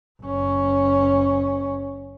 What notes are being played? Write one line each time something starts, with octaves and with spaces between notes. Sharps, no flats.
F#1 C#4